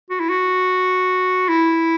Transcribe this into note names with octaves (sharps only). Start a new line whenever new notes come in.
F#4
E4
F#4
E4